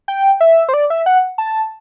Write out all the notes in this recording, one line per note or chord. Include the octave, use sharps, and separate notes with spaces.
G5
E5
C5
D5
E5
F#5
A5